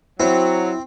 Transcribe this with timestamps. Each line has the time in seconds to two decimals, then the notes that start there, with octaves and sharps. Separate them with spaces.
0.20 F#3 C4 E4